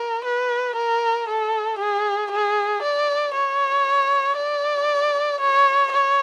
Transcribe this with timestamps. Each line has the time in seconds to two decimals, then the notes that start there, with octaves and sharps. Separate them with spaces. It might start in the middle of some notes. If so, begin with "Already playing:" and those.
Already playing: A#4
0.24 B4
0.76 A#4
1.28 A4
1.79 G#4
2.31 G#4
2.82 D5
3.34 C#5
4.36 D5
5.40 C#5
5.92 C#5